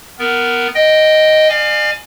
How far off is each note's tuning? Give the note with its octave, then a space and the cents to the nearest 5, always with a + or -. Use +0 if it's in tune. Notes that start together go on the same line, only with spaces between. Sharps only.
B3 +10 A#4 +0
D#5 +0 G5 +0
D5 +45 F5 +0 G#5 +0